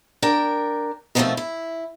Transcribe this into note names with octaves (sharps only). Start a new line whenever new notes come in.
D4 A#4 G5
B2 D#3 F3 G3 A3 C4
E4